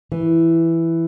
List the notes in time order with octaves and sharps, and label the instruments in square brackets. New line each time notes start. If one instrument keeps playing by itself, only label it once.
[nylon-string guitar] E3